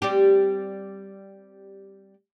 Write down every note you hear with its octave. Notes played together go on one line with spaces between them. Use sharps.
G3 C4 G4